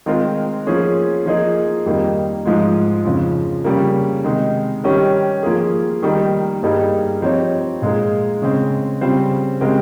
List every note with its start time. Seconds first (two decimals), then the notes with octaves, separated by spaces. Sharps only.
0.06 D#3 G#3 C4 F4 A#4
0.66 F3 A#3 C#4 G#4
1.26 F3 A#3 D#4 G#4 D#5
1.86 F2 D#3 G3 A#3 D#4
2.45 G#2 F3 G#3
3.05 F2 C#3 F3
3.64 C#3 G3 A#3
4.24 C3 D#3 G#3 D#4
4.84 D#3 G3 C#4 G4 A#4
5.43 F3 A#3 F4 G#4
6.03 D#3 G3 A#3 D#4
6.63 G2 G3 A#3 D#4 G#4
7.22 F3 C4 D#4 G4 C#5
7.82 A#2 G#3 D#4 G#4
8.42 C#3 G#3 C4
9.01 C#3 G3 C4 F4 C5
9.61 C#3 G#3 C4 G4 A#4